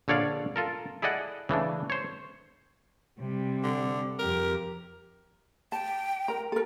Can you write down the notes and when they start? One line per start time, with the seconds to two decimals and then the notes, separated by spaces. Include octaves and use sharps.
0.08 A#1 D3 C#5 D5 F5
0.56 F4 A4 A#4
1.02 E4 G#4 A4 D5 D#5 F#5
1.49 C#3 E3 A3 D4
1.90 C5 C#5
3.19 C3 G3
3.63 D3
4.19 F2 G4 A#4
5.72 G5 A5
6.28 A#4 A#5
6.52 A4 A#4